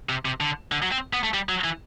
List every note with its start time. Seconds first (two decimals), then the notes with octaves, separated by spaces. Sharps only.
0.09 C3
0.25 C3
0.41 D3
0.72 D3
0.82 F#3
0.92 C4
1.13 B3
1.23 A3
1.34 G3
1.49 F#3
1.64 E3